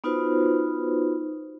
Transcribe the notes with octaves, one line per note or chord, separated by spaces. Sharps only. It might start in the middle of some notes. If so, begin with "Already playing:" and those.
B3 D#4 F4 F#4 B4 C5